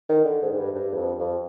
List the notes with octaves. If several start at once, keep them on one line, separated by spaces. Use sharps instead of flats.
D#3
D3
G#2
G#2
G2
G2
E2
F2
F2